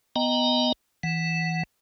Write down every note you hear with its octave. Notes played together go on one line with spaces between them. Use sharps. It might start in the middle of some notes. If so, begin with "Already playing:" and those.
B3 D#5 G5 A#5
E3 F#5